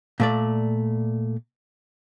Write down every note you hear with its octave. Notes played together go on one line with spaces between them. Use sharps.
A#2 A3 D5